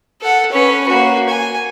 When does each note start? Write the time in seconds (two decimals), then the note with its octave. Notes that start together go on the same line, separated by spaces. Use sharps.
0.22 A4 F#5
0.52 C#4 B4
0.88 A#3 F#4
1.29 G#5